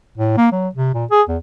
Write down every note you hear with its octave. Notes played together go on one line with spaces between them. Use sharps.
A2
A#3
F#3
C3
A#2
G#4
E2